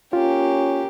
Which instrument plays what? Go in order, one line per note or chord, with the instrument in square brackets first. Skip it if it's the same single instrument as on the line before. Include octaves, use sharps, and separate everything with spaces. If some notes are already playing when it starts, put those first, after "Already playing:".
[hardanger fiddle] A#3 G4 [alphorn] C#4 [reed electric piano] F4